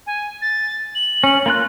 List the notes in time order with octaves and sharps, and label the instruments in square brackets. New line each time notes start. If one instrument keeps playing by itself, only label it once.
[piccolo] G#5
A6
F#7
[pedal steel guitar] C#4
A#3 F4 F#6